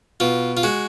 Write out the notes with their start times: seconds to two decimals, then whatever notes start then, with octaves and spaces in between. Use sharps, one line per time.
0.20 B2 F4
0.57 F4
0.63 G#3 F#4